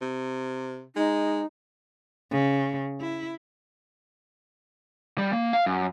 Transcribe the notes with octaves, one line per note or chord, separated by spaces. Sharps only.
C3
G#3 D#4
C#3
E4
G3
A#3
F5
F#2